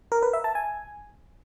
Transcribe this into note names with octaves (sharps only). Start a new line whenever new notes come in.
A#4
B4
E5
A5
G#5